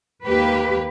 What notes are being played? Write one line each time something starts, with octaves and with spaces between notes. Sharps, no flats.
D#2 A#3 G4 B4